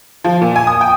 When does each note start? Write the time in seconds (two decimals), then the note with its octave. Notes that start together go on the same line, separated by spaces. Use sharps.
0.24 F3
0.41 A#2
0.56 G#5
0.67 D#6
0.81 G5